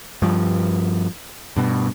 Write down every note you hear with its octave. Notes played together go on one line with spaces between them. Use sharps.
G2 F3
G2 B2